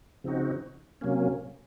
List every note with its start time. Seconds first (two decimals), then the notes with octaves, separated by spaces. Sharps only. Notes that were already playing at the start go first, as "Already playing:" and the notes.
0.24 C#3 F3 C4 D#4 F#4
1.01 C3 F#3 A#3 C#4